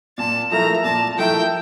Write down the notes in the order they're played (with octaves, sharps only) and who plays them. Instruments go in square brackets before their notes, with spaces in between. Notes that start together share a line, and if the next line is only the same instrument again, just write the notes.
[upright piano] A#2 [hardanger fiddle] A5
[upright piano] F3 A3 E4 A#4 [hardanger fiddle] A#5
[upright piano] A#2 [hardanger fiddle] A5
[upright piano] F3 A3 E4 A#4 [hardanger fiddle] G5